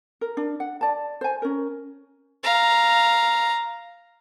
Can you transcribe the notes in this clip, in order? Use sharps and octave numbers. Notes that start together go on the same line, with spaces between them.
A#4
D4
F#5
D5 A5
C5 G#5
C#4 A#4
F5 A#5